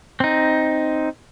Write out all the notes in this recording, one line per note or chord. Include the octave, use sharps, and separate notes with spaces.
C4 D#4